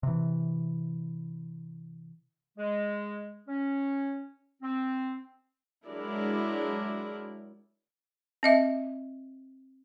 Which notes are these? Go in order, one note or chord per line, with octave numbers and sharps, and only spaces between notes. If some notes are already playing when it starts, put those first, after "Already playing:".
C3 E3
G#3
C#4
C4
F#3 G#3 D4 E4 A#4 D5
C4 D#5 E5